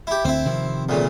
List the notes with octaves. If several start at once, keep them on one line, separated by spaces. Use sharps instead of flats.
E4 G4
D2 C4 E4
C3 D#3 F3
D2 A#2 C#3